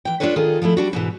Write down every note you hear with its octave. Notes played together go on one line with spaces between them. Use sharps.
E3 G5
D4 F4 F#4 A4 B4 C#5
D#3 F4 G#4 A4
F3 G#3 A3 E4
G3 D4 F#4
G#2 B2 E3